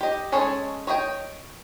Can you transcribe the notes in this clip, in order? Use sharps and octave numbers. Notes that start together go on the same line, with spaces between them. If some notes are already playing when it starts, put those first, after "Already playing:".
G4 D#5
G#3 C#4 G#4 A4 C#5
C#5 D#5 E5 G5